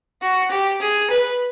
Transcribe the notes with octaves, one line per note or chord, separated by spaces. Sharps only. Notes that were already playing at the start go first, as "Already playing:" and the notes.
F#4
G4
G#4
B4